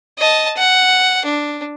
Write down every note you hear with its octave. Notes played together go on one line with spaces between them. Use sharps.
D#5 A5
F#5
D4